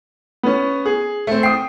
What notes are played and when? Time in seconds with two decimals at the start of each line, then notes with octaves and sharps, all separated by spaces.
0.43 B3 C#4
0.85 G#4
1.27 A3 C4
1.43 G5 D#6 C7